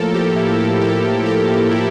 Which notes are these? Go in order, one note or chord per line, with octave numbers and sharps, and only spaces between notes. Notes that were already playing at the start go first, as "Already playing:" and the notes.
Already playing: A2 F3 A#3 A4 A#4
G4
E4
G4
G4
G4
E4